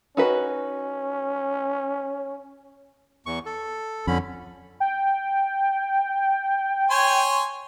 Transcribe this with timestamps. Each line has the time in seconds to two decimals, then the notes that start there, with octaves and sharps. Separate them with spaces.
0.17 C#4 D#4 F#4 B4
3.26 E2 C#6
3.46 A4
4.07 F2 D3 C#4 B5
4.80 G5
6.91 C#5 G#5 C6